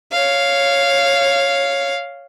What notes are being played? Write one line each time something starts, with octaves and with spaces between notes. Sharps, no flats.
C#5 F5